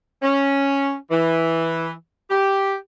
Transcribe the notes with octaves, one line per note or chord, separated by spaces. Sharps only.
C#4
E3
G4